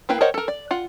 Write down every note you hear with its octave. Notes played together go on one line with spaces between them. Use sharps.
A#3 E4 B4 F5 G5
A#4 C5 C#5 D#5 F#5
A4 A#4
D5
F4 F#5